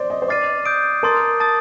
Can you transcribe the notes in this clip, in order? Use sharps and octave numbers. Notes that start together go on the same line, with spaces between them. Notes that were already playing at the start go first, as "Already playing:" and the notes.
Already playing: C5 D5
D#5
C5
D5 D6 F6 A6 C7 D#7
D#6 G6 D7
A#4 A5 C6 D#6 A6
A5 D#6 A6